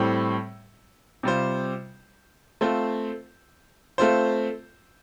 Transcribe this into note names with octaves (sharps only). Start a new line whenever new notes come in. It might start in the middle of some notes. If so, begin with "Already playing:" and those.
Already playing: A2 G3 C4 A4
C3 G3 F4 C5
A3 C4 F4 C5
A3 C4 F4 C5